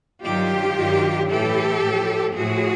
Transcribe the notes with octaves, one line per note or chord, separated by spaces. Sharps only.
G2 D#3 F#3 F4 G4
G2 D#3 F#3
A2 E3 G4 A4
A2 F3
A2 F3 F#4 G#4